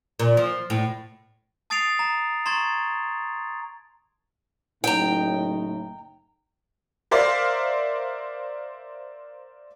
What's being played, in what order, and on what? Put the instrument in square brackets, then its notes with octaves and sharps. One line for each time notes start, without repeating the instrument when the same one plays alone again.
[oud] A#2
F3
A2
[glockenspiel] A5 D#6 A6 C7 D7 F7
A#5
A#5 C6 C#6 G#6 A6
[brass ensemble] F#1 A2 D#4 [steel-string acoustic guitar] G5 A#5
[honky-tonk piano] A#4 C5 D5 E5 F5